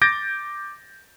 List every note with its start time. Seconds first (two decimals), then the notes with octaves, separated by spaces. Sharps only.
0.02 D6 G6 A6 A#6 D7